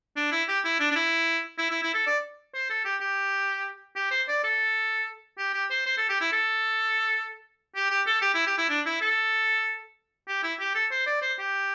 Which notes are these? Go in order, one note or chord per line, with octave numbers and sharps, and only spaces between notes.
D4
E4
G4
E4
D4
D4
E4
E4
E4
E4
A4
D5
C5
A4
G4
G4
G4
C5
D5
A4
G4
G4
C5
C5
A4
G4
E4
A4
G4
G4
A4
G4
E4
G4
E4
D4
E4
A4
G4
E4
G4
A4
C5
D5
C5
G4